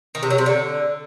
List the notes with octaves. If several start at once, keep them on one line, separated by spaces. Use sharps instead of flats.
D#3
C3
F#3
C3
D3